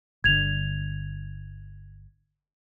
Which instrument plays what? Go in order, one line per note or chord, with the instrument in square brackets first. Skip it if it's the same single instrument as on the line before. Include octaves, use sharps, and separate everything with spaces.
[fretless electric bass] G1 D3 [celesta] G#6 F7